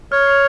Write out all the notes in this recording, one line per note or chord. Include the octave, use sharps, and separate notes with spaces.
C#5 F6
C7 F7